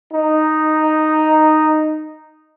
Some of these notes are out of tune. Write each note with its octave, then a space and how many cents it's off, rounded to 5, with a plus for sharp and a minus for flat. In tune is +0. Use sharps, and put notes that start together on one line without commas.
D#4 -5